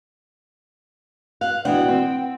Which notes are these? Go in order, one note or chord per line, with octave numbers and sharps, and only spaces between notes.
F5 F#6
B2 E3 D4 F#5 G5
C4